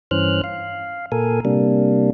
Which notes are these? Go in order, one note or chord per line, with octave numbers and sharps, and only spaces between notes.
G2 E3 C#4 C5 F6 F#6
F5
A#2 A4 A#4 G#5
C3 G3 A#3 D4